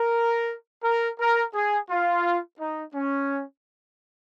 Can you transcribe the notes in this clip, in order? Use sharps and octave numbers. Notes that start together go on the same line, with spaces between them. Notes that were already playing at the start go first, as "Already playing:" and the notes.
Already playing: A#4
A#4
A#4
G#4
F4
D#4
C#4